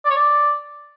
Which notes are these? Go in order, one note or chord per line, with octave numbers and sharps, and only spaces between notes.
D5
C#5
D5